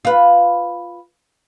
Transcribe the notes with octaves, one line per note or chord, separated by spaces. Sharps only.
F4 B4